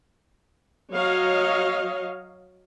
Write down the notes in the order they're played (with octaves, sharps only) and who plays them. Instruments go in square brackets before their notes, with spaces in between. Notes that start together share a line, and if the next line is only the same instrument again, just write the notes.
[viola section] F#3 C#5 D#5 F5